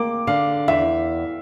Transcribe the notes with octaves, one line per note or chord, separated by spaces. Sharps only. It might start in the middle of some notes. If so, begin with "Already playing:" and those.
Already playing: A#3 D6
D3 F5
E2 E5